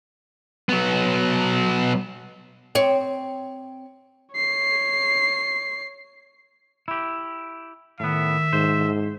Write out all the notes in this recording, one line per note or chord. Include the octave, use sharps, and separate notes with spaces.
F#3 B3
C4 C#5
C#5 C7
E4 G4
A2 D#3 B3 E5
G#2 C5